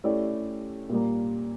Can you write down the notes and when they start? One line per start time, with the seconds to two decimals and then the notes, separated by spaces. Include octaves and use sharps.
0.04 A3 C#4 E4 G4 D5
0.89 A#2 G3 A#3